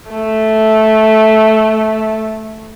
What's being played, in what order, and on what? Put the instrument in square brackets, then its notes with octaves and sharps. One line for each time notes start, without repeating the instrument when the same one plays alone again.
[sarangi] A3